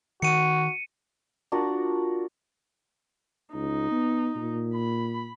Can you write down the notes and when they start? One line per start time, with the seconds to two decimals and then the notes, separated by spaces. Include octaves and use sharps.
0.22 D#3 F#4 C#7 D#7
1.52 D4 F4 F#4 A#4
3.55 C#2 D#4
3.91 B3
4.36 A#2
4.75 B5